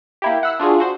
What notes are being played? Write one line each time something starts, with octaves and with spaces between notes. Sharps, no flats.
A#3 E4 G4
F#5 B5 E6 F#6 C7
D4 F4 F#4 G#4
F#4 C5